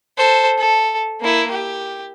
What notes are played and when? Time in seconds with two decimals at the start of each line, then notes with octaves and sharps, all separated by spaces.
0.17 A4 C5
0.58 A4
1.21 A#3 E4
1.51 G4